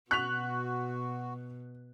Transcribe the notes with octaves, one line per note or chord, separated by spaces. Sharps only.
B2 F#4 C#6 F#6 B6 F7